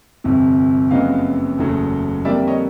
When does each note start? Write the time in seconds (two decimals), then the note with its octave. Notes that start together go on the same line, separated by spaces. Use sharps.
0.24 G1 F2 C3
0.91 F#1 F2 C#3 F#3 B3 D#5 F5
1.58 F#1 E2 C#3 F#3 A3
2.25 F2 D3 G3 A#3 D5 E5
2.48 C#5 D#5